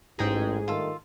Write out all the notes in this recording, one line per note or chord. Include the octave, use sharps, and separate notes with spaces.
A1 G#2 G#4 D#5 G5 A#5
G2 D#3 A3 F4 A4